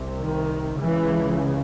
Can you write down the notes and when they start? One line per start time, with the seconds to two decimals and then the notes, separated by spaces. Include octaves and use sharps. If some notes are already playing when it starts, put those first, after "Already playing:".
Already playing: C2 C3
0.17 D#3
0.78 C#2 C#3 E3